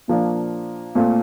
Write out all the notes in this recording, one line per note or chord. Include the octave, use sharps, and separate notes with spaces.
A#2 F3 A#3 D4
A#2 A3 C4 F4